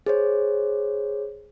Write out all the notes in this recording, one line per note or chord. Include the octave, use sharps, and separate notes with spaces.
G#4 C5 C#5